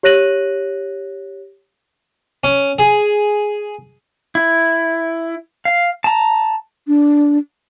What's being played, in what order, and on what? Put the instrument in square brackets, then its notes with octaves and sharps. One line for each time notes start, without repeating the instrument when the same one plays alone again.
[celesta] G4 C#5 F#6 A#6 D#7 F#7
[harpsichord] C#4
G#4
[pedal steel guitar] E4
F5
A5 A#5
[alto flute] D4